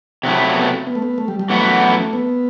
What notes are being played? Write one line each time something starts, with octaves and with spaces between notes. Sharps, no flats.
C3 F#3 A3 C4 E4
B3
B3
A3
B3
A3
G3
G3
F#2 E3 A3 B3 F#4
B3